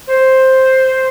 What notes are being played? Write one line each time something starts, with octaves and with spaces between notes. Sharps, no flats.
C5